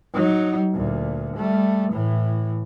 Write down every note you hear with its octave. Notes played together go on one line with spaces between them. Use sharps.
F#3 D#4
D2 A#2
G3 A3
A2 E3